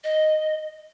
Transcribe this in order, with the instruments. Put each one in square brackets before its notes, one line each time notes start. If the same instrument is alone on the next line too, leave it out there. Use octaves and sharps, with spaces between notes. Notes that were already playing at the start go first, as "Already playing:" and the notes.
[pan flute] D#5